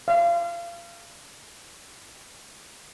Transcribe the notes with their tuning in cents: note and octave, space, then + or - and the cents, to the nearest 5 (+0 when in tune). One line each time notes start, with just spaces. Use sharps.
F5 -30